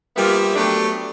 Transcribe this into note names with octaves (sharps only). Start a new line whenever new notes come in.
F3 G3 A#3 B3 F4 E5
F#3 A3 B3 D4 G4